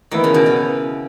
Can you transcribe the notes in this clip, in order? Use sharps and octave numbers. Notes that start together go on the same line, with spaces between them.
D#3 E3 B3 E4
C#3
B2
C#3